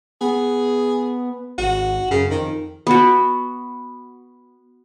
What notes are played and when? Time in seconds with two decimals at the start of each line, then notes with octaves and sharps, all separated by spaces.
0.21 B3 G#4
1.58 G#1 F#4
2.10 F#2 C#3
2.30 F2 D#3
2.87 B3 F#4